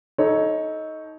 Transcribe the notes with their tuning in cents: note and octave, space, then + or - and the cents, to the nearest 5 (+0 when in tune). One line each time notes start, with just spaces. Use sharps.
D#4 +15 A4 -15 C#5 +0